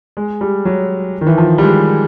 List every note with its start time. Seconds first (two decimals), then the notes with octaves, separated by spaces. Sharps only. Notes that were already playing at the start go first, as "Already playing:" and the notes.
0.17 G#3
0.41 G3
0.65 F#3
1.21 D#3
1.27 E3
1.38 F3
1.58 G3
1.63 G#3